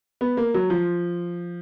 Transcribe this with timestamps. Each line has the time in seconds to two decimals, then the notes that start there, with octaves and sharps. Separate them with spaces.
0.21 B3
0.37 A#3
0.54 F#3
0.70 F3